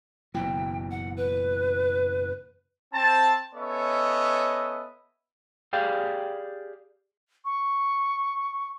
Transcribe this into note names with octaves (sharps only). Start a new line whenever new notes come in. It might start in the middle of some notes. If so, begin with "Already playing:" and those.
F#1 B2 E3 G5
F#5
B4
C4 A5
B3 C#4 A4 C#5 D#5 E5
G4 G#4 D5 F5 G5
C#6